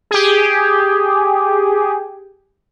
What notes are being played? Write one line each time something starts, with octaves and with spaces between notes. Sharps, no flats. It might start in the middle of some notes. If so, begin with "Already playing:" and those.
G4 G#4